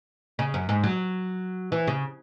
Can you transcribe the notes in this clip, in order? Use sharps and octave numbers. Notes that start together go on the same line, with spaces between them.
C#3
F#2
G#2
F#3
E3
C#3